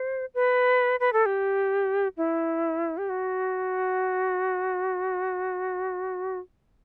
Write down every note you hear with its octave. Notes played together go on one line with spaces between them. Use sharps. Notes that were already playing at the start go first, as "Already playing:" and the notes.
Already playing: C5
B4
B4
A4
G4
E4
G4
F#4